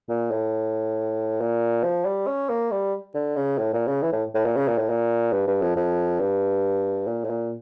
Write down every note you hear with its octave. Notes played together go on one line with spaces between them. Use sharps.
A#2
A2
A#2
F3
G3
C#4
A#3
G3
D3
C#3
A2
A#2
C#3
E3
A2
A2
A#2
C#3
A#2
A2
A#2
G2
G2
F2
F2
G2
A#2
A2
A#2